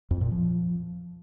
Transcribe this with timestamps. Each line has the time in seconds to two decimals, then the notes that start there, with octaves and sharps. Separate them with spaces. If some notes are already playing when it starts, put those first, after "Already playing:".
0.11 F2
0.21 A#2
0.31 F3